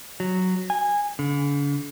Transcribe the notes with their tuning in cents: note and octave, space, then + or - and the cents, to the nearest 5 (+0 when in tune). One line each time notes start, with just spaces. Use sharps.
F#3 +0
G#5 -15
D3 -45